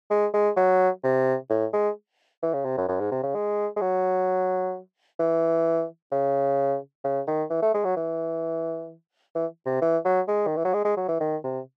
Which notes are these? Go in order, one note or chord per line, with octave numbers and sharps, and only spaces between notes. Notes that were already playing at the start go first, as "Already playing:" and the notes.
G#3
G#3
F#3
C3
A2
G#3
E3
C#3
C3
F#2
F#2
G#2
C3
C#3
G#3
G#3
F#3
E3
C#3
C#3
D#3
E3
A3
G#3
F#3
E3
E3
C3
E3
F#3
G#3
D#3
E3
F#3
G#3
G#3
F#3
E3
D#3
C3